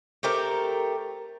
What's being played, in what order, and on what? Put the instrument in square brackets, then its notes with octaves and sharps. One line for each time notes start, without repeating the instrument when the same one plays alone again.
[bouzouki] A3 C4 G4 A#4